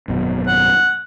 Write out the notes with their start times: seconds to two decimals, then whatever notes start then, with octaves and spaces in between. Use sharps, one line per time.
0.08 G#1 F#2 B2
0.47 F#5